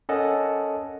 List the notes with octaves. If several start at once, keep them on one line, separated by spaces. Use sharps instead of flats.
C#4 A4 A#4 D#5 F#5 A5